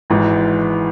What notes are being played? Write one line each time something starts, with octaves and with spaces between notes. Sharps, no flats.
G#1 G#2 E3